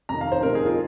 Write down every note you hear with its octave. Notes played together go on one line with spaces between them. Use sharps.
F2 C3 D#3 A#5
F5
C5
F2 C3 D#3 A#4
G#4
F4